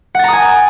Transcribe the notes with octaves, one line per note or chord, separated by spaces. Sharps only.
F#5 G#5 A#5 D#6 A6